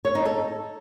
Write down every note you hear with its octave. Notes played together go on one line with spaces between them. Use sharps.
C#5
D#4
A4